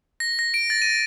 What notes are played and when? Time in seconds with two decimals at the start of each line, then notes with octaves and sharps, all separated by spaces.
0.20 A#6
0.39 A#6
0.54 D7
0.70 A6
0.82 D#7